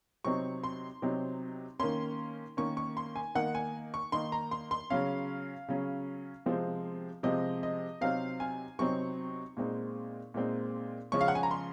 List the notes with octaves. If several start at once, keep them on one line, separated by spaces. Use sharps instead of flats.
C3 F#3 C4 D#4 C#6
C6
C3 F#3 C4 D#4
D#3 A#3 C#4 C6
D#3 A#3 C#4 C#6
C#6
C6
G#5
D#3 A#3 D#4 F#5
G#5
C#6
D#3 A#3 D#4 C6
A#5
C6
C6
C#3 F#3 C#4 F5
C#3 F#3 C#4
C3 F3 G#3 C4
C3 F3 G#3 C4 D#5
D#5
C3 F#3 C4 D#4 F5
G#5
C3 F#3 C4 D#4 C#6
A#2 G#3 C4 D#4
A#2 G#3 C4 D#4
C#3 F3 G#3 C#4 C#6
F5
F#5
G#5
A#5
C6